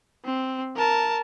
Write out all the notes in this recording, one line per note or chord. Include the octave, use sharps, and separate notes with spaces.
C4
A#4 A5